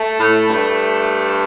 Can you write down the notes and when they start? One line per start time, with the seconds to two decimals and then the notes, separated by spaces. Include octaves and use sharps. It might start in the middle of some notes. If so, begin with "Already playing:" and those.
Already playing: A3
0.20 A2
0.49 G2